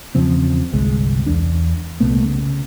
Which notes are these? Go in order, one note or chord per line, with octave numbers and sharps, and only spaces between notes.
E2 C#3 F3 C4
G1 C2 G#3
E2 D4
C2 A#2 A3 B3
C#3